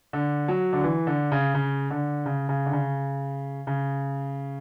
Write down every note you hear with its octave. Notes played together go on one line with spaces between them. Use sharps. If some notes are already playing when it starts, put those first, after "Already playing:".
D3
F#3
D3
E3
D3
C#3
C#3
D3
C#3
C#3
D3
C#3
C#3